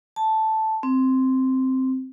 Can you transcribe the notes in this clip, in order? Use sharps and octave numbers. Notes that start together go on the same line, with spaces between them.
A5
C4